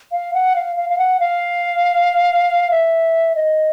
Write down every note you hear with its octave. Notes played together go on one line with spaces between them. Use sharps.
F5
F#5
F5
F5
F5
F#5
F5
E5
D#5